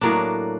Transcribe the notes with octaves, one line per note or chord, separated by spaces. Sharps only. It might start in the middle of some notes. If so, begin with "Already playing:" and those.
A2 F#3 A#3 D4